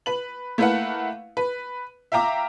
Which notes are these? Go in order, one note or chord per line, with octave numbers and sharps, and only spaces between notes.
B4 F#7
A3 A#3 E4 B4 F5 F#5
B4
E5 F5 G5 A#5 D6